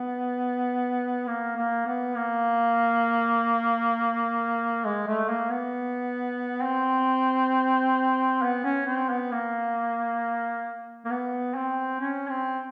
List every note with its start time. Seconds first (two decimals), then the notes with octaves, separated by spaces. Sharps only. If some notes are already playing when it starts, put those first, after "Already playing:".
Already playing: B3
1.28 A#3
1.57 A#3
1.87 B3
2.16 A#3
4.85 G#3
5.08 A3
5.30 A#3
5.51 B3
6.64 C4
8.43 B3
8.64 C#4
8.87 C4
9.10 B3
9.32 A#3
11.05 A#3
11.11 B3
11.55 C4
12.00 C#4
12.30 C4